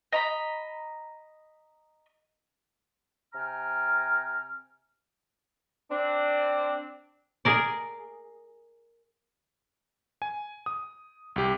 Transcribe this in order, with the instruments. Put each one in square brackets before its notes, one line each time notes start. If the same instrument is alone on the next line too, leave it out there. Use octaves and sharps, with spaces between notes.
[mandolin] D#5 A#5 B5
[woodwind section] C3 G5 G#5 A#5 F6
[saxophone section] C4 D4
[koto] G#4 A#4 D5
[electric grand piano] G#5
D#6
C2 G4